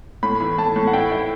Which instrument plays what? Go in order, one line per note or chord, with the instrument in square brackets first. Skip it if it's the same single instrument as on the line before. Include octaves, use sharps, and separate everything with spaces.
[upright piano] A2 [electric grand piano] B5
[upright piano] E3
[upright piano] A2 [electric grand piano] A5
[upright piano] A2
[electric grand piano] F#5
[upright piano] E4 [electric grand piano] G5
[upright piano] E4